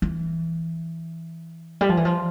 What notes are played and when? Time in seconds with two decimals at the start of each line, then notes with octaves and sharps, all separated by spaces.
0.02 E3
1.81 G3
1.89 F3
1.97 E3
2.05 F3